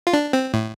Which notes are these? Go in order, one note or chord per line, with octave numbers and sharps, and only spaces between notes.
F4
D4
C4
A2